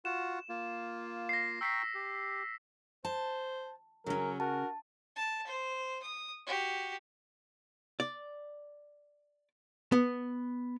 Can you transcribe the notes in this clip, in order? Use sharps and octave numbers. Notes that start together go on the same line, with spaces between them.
F4 F#4 F#5 E7
A#3 F4
A#6 C7
G5 A#5 C#6 E6 B6 C7
G4
C5 A5
C#3 F#3 C#4 A#4
F#4 A#4 A5
A5
C5
D#6
F#4 G4
D5
B3